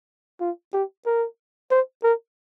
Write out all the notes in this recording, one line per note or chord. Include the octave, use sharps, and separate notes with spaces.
F4
G4
A#4
C5
A#4